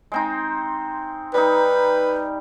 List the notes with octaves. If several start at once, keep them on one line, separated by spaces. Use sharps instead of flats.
G#3 C4 D#4
G3 D#4 B4